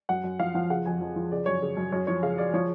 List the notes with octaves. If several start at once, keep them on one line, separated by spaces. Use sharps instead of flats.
F#2 F#5
F#2
F3 F5
F3 F#5
C#3 F#5
F2 G#5
F2
F3
C#3 D5
F#2 C#5
C#3
F#2
F#2 C#5
F3 C#5
C#3 F5
C#3 D5
F3 C#5